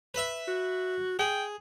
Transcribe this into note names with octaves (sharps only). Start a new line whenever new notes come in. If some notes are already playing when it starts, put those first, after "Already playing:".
B4 E5
F#4
G#4 G5